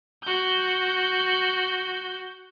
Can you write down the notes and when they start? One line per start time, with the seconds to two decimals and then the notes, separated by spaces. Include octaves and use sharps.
0.23 F#4 G6